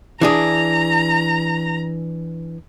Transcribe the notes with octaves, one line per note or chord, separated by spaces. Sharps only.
E3 D4 G#4 A#5